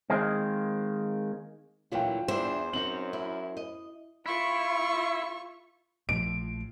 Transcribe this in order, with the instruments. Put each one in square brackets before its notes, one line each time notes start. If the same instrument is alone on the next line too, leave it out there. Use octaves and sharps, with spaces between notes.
[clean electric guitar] D#3 G#3 A#3 C4
[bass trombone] D2 [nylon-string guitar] A#2 E3 F#3 [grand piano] F4 G5
[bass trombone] E2 [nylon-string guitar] D4 E5 [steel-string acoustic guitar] C5
[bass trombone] F#2 [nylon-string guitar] C4 D#4 C#5 [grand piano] F#7
[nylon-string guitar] E4
D#5
[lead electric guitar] E4 [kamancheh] F4 C#6
[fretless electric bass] A#1 A2 F3 [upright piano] D7